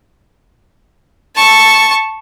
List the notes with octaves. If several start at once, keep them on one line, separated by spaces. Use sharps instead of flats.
A5 C#6